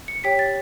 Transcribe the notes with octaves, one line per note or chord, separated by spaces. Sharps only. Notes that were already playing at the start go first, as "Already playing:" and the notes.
C#7
G4 C#5 G5 B6
A6